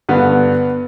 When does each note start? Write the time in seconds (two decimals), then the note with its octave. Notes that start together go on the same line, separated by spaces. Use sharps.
0.09 G2 D3 B3